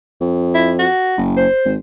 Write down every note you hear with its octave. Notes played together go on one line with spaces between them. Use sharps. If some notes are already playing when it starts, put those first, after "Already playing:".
F2
E4
F#4
F#1
C5
G#1